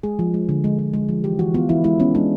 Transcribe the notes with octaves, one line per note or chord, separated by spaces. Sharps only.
G#3 G#4
F3
G#3
D3
G#3
G#3
G#3
F3
E3 G4
E3 F#4
B3 F4
E3 E4
G#3 E4
B3 C#4
G#3 D4